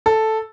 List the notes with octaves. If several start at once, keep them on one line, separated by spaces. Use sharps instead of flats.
A4